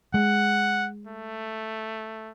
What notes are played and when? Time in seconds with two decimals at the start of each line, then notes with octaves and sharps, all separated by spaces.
0.14 G#3 F#5
1.07 A3